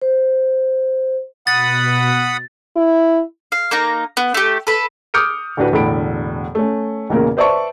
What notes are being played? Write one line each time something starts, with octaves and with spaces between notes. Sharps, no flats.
C5
B2 F#5 B5 D#6 A6
E4
F5
A#3 D#4 A#5
B3
A3 G4
A4 B4
D6 D#6 F6 G6 C#7 D7
D2 A2 D4 F#4 B4
E1 A2 D3 A4 B5 D7
A3 C#4
B1 E2 A#2 C#3 A#3 A#4
B4 C5 D5 E5 A5 C#6